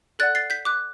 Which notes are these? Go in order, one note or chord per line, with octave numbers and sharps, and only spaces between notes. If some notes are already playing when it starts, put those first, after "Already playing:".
A4 D5 F#5 F#6 A6
A6 C7
G6 B6
D6 F#6